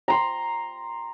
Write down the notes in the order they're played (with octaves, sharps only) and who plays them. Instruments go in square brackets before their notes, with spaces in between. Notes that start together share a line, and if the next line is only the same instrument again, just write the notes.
[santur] A#5 C6